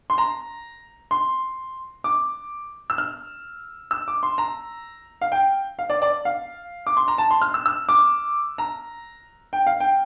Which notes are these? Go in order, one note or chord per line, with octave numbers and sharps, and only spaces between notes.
C6
A#5
C6
D6
E6
F6
E6
D6
C6
A#5
F5
G5
F5
D5
D5
F5
D6
C6
A#5
A5
C6
F6
E6
E6
D6
A#5
G5
F5
G5